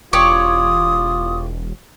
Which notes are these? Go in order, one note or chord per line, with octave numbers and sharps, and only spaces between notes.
E1 F4 G4 C#5 D5 D#6